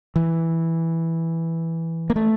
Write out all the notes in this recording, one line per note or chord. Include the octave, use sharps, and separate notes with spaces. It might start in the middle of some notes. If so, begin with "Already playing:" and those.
E3
A#3
A3